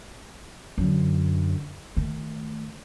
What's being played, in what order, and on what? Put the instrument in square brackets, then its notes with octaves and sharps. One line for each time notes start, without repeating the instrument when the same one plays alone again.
[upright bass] F#2 D3
D#3 A3